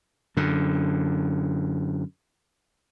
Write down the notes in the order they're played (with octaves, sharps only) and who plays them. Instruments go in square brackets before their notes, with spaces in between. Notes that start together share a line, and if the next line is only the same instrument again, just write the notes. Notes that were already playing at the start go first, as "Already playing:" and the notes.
[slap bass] F#2 D3